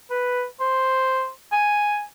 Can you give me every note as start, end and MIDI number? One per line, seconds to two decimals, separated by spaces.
0.10 0.44 71
0.60 1.29 72
1.52 2.04 80